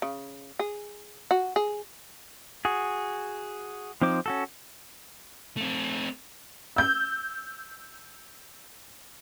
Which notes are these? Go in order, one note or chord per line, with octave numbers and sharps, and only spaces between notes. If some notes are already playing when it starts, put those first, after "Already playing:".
C#3
G#4
F#4
G#4
F#4 G#4
F3 C4 D#4 C5 D6
C#4 F#4 A4
A3 C4
E6 G6